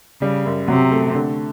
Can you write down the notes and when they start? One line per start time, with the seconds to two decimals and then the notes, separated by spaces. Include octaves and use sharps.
0.21 C#3 G3
0.45 F#2
0.68 C3 F#3
0.92 A3
1.15 D3